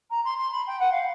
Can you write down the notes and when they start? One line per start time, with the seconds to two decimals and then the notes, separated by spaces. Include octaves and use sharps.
0.10 A#5
0.24 C6
0.38 C6
0.52 B5
0.67 G5
0.79 F#5
0.92 F5